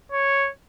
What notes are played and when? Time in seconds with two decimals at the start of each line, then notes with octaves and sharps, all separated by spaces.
0.12 C#5